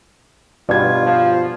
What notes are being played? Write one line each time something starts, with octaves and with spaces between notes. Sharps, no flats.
G2 B2 F4 D5 G#6
F3